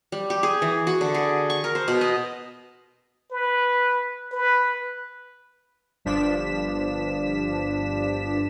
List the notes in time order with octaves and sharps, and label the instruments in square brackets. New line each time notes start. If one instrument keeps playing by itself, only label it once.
[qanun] G3
G4
G#4
E3
F#4
D3
G#4
C#6
A#4
C5
B2
D#5
[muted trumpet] B4
B4
[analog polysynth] G1 G2 F3 D4 B6 E7